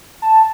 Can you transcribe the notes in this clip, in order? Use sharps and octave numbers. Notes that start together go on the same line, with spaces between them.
A5